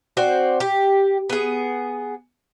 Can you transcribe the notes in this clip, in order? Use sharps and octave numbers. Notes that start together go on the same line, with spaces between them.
C4 F#4 C5 D5
G4
B3 G#4